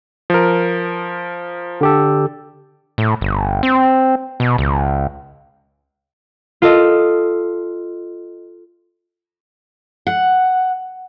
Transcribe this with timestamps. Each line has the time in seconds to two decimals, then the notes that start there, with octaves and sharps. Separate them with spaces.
0.30 F3 A#4
1.81 D3 G4 A4
2.98 A2
3.21 G1
3.63 C4
4.40 B2
4.58 C#2
6.62 F4 A4 D#5
10.07 F#5